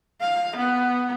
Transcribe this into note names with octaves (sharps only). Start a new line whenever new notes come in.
F5
B3